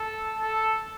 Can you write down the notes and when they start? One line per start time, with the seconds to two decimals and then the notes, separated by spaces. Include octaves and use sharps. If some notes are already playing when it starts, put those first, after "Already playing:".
Already playing: A4
0.40 A4